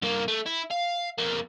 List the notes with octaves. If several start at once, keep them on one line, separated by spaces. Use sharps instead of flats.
G2 A#3
A3
E4
F5
F2 A#3